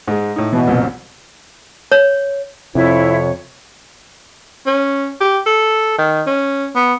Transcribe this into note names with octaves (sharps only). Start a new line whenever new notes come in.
G#2 G#3
A2 D#4
B2 E3
C2 F#2 A#2
C#5
F2 C3 E4 C#5
C#4
G4
A4
D#3
C#4
B3